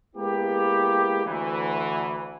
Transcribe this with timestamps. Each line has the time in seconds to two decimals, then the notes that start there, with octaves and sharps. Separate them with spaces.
0.16 G#3 A#3 B3 E4 G4
1.25 D2 E3